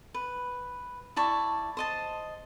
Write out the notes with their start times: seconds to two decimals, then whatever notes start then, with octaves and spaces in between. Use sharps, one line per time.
0.14 B4
1.16 E4 D5 A5 C#6
1.77 C5 D#5 A5